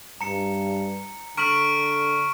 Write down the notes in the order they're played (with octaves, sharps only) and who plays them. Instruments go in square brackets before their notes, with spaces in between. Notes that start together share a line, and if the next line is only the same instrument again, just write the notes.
[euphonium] G2 [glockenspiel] A#5 C#7
[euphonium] D3 [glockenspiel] A#5 B6 F#7 [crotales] C#6 F6 D7